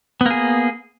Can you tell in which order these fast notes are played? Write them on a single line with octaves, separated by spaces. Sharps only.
B3 A#3 G#4